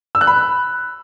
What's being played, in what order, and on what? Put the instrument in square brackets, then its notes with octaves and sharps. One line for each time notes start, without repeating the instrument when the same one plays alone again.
[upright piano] E6
F#6
B5